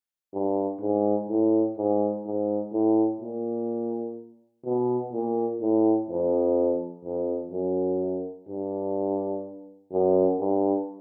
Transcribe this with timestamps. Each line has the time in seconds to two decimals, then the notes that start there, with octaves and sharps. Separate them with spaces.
0.34 G2
0.81 G#2
1.29 A2
1.77 G#2
2.26 G#2
2.73 A2
3.21 A#2
4.65 B2
5.13 A#2
5.61 A2
6.09 F2
7.05 F2
7.52 F#2
8.49 G2
9.92 F#2
10.40 G2